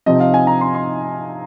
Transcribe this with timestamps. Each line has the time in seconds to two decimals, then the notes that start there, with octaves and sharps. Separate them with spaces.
0.06 C3 F3 C4 D#4 D#5
0.20 F5
0.34 G#5
0.47 A#5
0.61 C6
0.74 C6